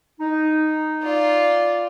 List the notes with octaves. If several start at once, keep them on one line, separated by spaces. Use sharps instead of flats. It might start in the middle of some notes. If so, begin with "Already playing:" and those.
D#4
F4 D5